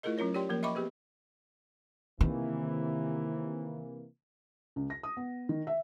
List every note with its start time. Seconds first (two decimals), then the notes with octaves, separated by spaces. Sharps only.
0.03 A3 E4 F4 G#4 A#4 D#5
0.18 F#3 C#4 F4 A#4 C#5
0.34 G4 C#5 D5 G5 C6
0.49 F3 A#3 A#4
0.63 D#5 E5 G5 B5 C#6 D6
0.75 B3 G4 G#4 B4
2.21 C3 D#3 E3 A#3
4.76 C#2
4.90 A#6
5.03 D#6
5.17 B3
5.49 D#3
5.67 E5